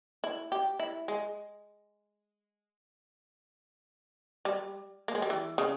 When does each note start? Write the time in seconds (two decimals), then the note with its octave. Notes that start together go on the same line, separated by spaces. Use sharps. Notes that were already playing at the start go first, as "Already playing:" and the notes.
0.24 E4
0.52 G4
0.79 E4
1.08 G#3
4.45 G3
5.08 A#3
5.15 G#3
5.22 G3
5.30 E3
5.58 C#3